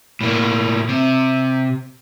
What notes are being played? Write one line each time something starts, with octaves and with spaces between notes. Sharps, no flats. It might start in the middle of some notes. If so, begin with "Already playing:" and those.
A2 A#3
C3